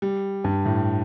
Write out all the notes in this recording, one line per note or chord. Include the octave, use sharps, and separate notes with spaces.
G3
G2
A2